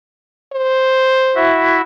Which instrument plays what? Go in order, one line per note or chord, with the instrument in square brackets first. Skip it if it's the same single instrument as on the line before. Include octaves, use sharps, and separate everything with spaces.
[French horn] C5
[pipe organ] E4 F#4 E5